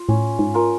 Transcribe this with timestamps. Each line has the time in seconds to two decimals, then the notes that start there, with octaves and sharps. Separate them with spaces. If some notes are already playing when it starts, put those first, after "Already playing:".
Already playing: F4
0.08 A2 C#4
0.39 G#2
0.54 F4 A#4